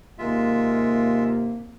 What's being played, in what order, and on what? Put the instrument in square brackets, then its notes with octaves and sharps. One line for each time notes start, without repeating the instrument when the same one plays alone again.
[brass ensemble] D#2 C3 A#3 [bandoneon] G#3 F4 E5